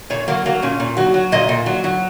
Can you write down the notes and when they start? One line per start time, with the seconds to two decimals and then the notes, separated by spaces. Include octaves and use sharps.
0.10 A#2 C#5
0.28 F#3 A#3
0.46 F#3 A#3
0.62 A#2 C#4
0.80 A#2
0.97 F#3 F#4
1.14 F#3
1.32 A#2 D#5
1.49 A#2
1.66 F#3
1.84 F#3